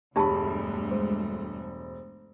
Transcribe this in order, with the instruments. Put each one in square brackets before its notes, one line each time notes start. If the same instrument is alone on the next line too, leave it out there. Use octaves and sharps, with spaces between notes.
[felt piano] E1 B5 [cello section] D2 G2 A3 [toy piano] D4 G4 A5
[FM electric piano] G#3 C5